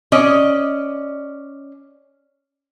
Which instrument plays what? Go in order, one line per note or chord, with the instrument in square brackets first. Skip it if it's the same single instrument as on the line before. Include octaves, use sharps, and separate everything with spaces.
[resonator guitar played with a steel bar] C#4 D5 D#5